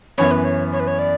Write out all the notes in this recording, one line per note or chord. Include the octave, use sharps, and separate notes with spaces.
F#2 E3 B3 C#5
B4
C#5
C#5
B4
C#5
D5